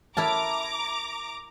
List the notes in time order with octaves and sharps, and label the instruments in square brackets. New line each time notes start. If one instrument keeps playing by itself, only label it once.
[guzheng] E4 A#4 A5 [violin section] A#5 D6